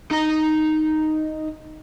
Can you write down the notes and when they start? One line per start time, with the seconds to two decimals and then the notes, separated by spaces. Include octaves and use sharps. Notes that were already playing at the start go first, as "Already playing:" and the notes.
0.11 D#4 A#5